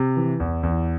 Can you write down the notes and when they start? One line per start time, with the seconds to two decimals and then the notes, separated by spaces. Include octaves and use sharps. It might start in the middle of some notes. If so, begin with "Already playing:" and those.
Already playing: C3
0.17 E3
0.40 E2
0.63 E2